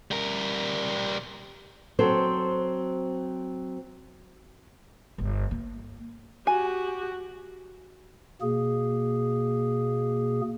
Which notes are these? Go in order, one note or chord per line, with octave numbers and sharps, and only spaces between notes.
G3 A#4
F#3 C4 A4 C5
G1
A#3
F#4 G4 G#5
B2 A#3 G#4